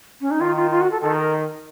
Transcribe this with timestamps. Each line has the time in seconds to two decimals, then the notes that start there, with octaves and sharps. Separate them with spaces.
0.21 C#4
0.31 D#4
0.40 D#3 F4
0.56 F4
0.71 F4
0.81 F#4
0.91 A4
1.01 D#3 A4
1.16 A#4